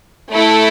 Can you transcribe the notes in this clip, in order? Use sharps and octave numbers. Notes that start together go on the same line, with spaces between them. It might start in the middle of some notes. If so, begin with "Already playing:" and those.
A3 E4 A4